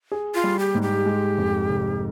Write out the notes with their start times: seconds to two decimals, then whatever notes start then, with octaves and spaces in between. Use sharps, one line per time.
0.12 G#4
0.35 F4
0.44 G3
0.59 G4
0.75 G#2
0.82 G4
1.06 G#3
1.38 F2
1.69 F1